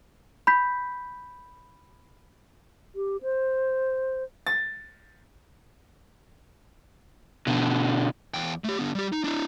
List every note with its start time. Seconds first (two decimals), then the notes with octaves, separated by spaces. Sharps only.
0.47 B5 G6 B6
2.95 G4
3.22 C5
4.47 A6
7.47 B2 D3
8.34 E2 G5
8.64 A3 G4
8.79 D3 B3
8.95 G3 G4
9.12 D#4
9.24 D4 E4